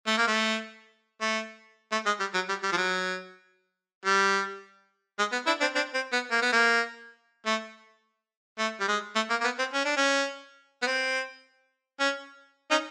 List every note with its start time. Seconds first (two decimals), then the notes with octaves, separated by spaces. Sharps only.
0.07 A3
0.18 A#3
0.27 A3
1.21 A3
1.92 A3
2.06 G#3
2.20 G3
2.34 F#3
2.49 G3
2.63 G3
2.72 F3
2.77 F#3
4.05 G3
5.19 G#3
5.32 B3
5.46 D4 E4
5.61 C4 D4
5.75 C4 D4
5.94 C4
6.12 B3
6.31 A#3
6.42 B3
6.52 A#3
7.46 A3
8.59 A3
8.80 G3
8.88 G#3
9.15 A3
9.30 A#3
9.41 A#3
9.44 B3
9.59 C4
9.73 C#4
9.85 D4
9.97 C#4
10.82 B3
10.86 C4
12.00 C#4
12.71 C#4 D#4